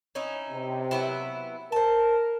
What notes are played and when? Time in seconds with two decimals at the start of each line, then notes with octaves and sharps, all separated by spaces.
0.15 C#4 D#4 E4
0.50 C3
0.91 F#3 B3 E4
1.72 A#4 C5 A5